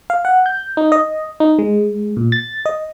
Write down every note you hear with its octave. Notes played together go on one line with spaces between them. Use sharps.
F5
F#5
G6
D#4
D#5
D#4
G#3
A#2
A6
D#5